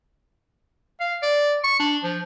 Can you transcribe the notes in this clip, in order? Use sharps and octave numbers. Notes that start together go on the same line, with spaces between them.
F5
D5
C#6
D4
F3